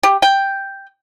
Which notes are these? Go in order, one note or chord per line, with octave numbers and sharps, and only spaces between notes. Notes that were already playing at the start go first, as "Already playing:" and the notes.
G4
G5